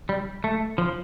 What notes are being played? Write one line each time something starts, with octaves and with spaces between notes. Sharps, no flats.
G3
A3
F3